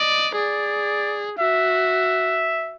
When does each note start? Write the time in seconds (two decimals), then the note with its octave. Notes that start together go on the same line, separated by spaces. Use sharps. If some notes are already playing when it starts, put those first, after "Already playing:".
Already playing: D5 D#5
0.35 G#4 D5
1.39 F#4 E5